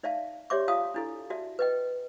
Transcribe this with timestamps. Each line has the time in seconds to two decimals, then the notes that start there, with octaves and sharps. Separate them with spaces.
0.03 D#4 D5 E5 F5 A5
0.50 G4 C#5 D5 E5 C6 D6
0.68 F4 D5 F5 A5 D#6
0.94 D4 E4 A4
1.30 F#4 D5 E5 A5
1.59 B4 D#5 G5